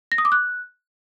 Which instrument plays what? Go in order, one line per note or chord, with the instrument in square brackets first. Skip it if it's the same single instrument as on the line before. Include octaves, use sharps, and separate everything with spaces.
[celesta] A#6
D#6
D6
F#6